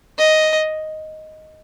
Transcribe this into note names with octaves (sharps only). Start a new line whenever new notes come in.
D#5